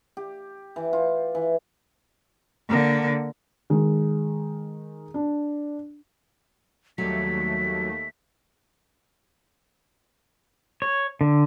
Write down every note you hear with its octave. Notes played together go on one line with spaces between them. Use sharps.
G4
E3
F4
E3
D3 A#3
D#3 G#3
D4
D#2 F#3 G3 A3 B6
C#5
D3